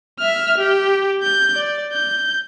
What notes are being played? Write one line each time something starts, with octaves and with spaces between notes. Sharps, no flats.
E5 F6
G4
G6
D5
G6